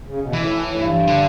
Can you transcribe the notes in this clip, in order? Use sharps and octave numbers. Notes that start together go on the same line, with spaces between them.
C#3
B2
A2 E3
G2
D3